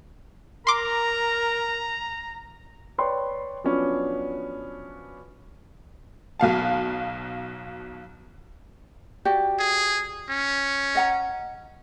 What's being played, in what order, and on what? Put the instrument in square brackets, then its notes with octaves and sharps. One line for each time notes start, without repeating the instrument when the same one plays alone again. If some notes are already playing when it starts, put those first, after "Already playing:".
[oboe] A#4 [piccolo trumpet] A#5 [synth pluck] C6 D6
[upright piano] B4 C#5 D5 G5 C6
F3 F#3 B3 C#4 D4
[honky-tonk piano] B1 B2 F5 A5
[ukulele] F#4 G4 D5
[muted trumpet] G#4
C#4
[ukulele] D#5 F#5 A#5